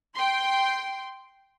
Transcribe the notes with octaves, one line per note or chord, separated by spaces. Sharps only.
G5 C6